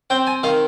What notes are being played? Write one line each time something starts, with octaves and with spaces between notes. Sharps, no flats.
C4 G5
G#5
D#3 F5